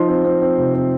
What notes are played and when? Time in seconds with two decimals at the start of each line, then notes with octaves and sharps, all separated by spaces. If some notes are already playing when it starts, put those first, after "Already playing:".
Already playing: F3 D#4 C6
0.09 C4
0.25 C4
0.42 C4
0.58 C3
0.74 C4